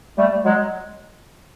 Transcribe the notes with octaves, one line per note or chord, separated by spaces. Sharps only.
G3 A3
F#3 G#3